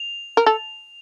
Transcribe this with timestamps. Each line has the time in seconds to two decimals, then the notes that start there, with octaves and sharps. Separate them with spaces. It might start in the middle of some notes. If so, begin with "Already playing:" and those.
Already playing: F7
0.37 A#4
0.46 A4